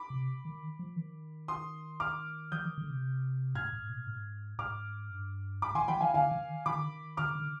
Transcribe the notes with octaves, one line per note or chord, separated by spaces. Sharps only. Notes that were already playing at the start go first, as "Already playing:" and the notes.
Already playing: B5 D6
C3
D#3
F3
D#3
C6 D#6
D6 F6
F3 D#6 G6
D#3
D3
C3
G#2 F6 G#6
G#2
B2
G#2
G#2 D6 F6
G2
G#2 B5 D6
D#3 G#5 C6
F3 G5 B5
D#3 F5 G#5
D3 F5 G#5
D#3
D#3 B5 D6
D3
D#3
D3 D6 F6
D3